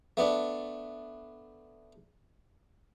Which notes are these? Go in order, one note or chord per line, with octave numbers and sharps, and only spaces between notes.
A3 B3 D4